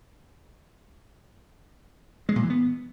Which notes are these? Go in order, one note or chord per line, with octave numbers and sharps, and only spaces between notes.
G#3
A#2
E3
B3